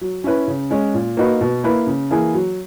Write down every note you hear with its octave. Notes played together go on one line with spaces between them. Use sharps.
F#3
C#4 E4 B4
C#3
G#3 C#4
A#2
A#3 D#4 F#4 B4
B2
A#3 E4 B4
C#3
E3 A#3 E4 G#4
F#3